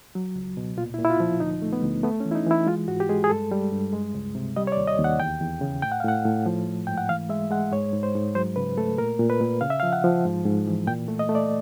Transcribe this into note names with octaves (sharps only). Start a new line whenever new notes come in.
F#3
C#2
B2
A#2 F4
E4
A#2
E4
F4
F3
D2 D#4
A3
B3
D2
A3 B3
C#4
E3
E4
D#4
E3 E4
G#3 F4
G#2 F#4
G4
G#3 G#4
G#4
G2 A4
G3
G2
G#3
C#2
C3
G3 D#5
C#5
D5
D#2
D#5
D#2
F#5
E2 G5
E2
C#3
A2 G5
F#5
F5
A2 F#5
A2
F3
A3
G#2 G5
F#5
E3 F5
G#3 E5
G#3 F#5
G#2 C#5
G#2
C5
G#2
F#3 C5
C#3 B4
A3 A4
A#2 A#4
A#2
B4
A#2
C#3 F5
E5
F5
F3
F#5
F3
G#2
G#2
E3
A#2 G5
A3
D#5
A3
D5